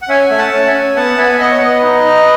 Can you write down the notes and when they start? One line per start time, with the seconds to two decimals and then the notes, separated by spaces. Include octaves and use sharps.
0.02 F#5
0.09 C#4 E5 G#5
0.30 A3
0.38 F#5 A5
0.52 C#4
0.67 E5 G#5
0.74 C#4
0.96 B3 F#5 A5
1.18 B3 E5 G#5
1.40 B3 D#5 F#5
1.51 C#5
1.61 B3 B4 D#5
1.82 D#4
2.05 D#4